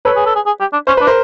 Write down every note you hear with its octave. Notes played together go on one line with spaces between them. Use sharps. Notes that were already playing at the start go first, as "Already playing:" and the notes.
A4 B4 C#5
G#4
A4
G#4
G#4
G4
D4
C#4 C5
D4 B4
A#4 C5